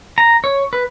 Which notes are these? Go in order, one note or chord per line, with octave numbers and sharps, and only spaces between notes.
A#5
C#5
B4